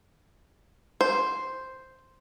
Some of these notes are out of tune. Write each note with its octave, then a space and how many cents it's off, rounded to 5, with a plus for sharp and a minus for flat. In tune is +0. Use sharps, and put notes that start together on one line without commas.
C5 +0